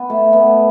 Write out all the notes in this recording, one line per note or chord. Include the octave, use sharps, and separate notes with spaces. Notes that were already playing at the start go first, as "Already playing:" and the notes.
Already playing: B3
A3
B3